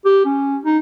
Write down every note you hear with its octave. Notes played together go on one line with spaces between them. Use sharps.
G4
C#4
D#4